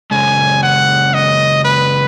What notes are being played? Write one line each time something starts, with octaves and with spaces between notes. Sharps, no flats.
F#2 C#3 G#3 G#5
F#5
D#5
B4